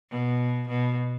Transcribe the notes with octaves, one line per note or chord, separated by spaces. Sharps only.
B2
B2